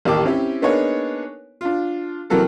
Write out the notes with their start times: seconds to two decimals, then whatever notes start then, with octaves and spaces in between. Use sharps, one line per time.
0.05 A1 D#2 A#3 G4 A5 D6
0.25 C4 C#4 E4 G4
0.62 A#3 B3 D4 D#4 G#4 C#5
1.61 D4 F4
2.30 C3 E3 F#3 A#3 A4 A#4